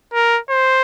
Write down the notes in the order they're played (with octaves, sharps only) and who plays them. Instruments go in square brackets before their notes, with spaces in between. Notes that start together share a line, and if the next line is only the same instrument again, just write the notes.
[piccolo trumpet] A#4
C5